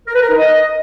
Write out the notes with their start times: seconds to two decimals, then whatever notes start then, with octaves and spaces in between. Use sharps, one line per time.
0.07 A#4
0.15 B4
0.22 A#4
0.30 D#4
0.37 D#5